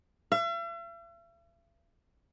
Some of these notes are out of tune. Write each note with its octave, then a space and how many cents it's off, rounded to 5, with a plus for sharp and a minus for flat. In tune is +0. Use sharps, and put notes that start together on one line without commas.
E5 +45